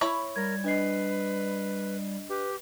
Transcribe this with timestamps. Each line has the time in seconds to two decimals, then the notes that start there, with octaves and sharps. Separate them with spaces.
0.01 E4 C#5 B5
0.36 G3 A#4 G#6
0.64 D4 B4 D#5 C7
2.29 G4 B4